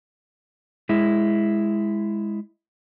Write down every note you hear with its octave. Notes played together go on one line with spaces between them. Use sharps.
G#3 E4